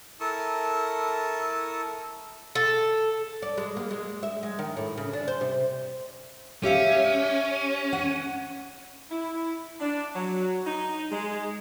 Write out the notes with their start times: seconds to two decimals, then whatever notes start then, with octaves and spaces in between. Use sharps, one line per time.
0.20 E4 A4 A#4 A5 C#6 D#6
2.55 A4
3.42 D5
3.58 G#3
3.77 A#3
3.91 G#3
4.23 E5
4.43 G#3
4.59 D#3
4.77 A2
4.97 C#3
5.13 D4
5.28 C5
5.41 C3
6.63 C#4 G4 E5 F5
7.93 F#5
9.10 E4
9.80 D4
10.15 F#3
10.65 D#4
11.11 G#3